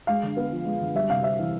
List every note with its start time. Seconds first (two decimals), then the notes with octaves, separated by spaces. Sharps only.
0.07 G#3 F5
0.23 D3
0.37 B3
0.52 F3
0.66 G#3
0.81 D3
0.95 G3 E5
1.09 C3 F5
1.23 C4 E5
1.39 E3